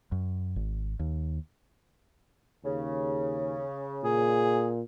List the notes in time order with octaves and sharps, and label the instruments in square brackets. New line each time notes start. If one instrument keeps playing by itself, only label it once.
[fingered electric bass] F#2
G#1
D#2
[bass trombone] D#2 [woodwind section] C#3
[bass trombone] A#2 [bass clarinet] G#4